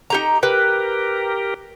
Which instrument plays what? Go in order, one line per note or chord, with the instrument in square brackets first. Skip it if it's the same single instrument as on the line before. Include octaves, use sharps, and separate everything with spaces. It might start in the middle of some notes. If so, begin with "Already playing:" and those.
[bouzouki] D#4 G4 A#5
[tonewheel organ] G4 A#4 [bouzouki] B4